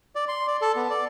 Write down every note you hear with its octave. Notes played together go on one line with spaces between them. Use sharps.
D5
C6
D5
A4
B3
D5